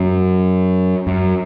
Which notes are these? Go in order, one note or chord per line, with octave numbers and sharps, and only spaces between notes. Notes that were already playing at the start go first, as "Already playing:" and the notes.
Already playing: F#2
F#2